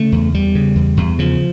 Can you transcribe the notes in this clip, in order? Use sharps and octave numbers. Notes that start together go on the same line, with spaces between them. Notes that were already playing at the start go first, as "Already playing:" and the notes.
Already playing: C#3 A3
E2
E2 G3
C#3
E2
E2
C#3 F3